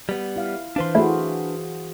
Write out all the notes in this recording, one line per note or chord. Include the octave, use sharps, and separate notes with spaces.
G3 B3
E4 F5
E3 D4 B4 C5 F5 C6
A3 E4 F#4 G#4